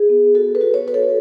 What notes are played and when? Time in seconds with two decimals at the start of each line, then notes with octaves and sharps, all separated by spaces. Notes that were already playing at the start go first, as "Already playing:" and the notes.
Already playing: G#4
0.09 B3
0.35 F#4 A4
0.55 B4
0.61 F#4
0.74 C#5
0.87 F#4 B4
0.94 A4